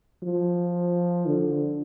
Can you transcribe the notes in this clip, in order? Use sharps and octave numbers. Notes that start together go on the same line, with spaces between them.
F3
D3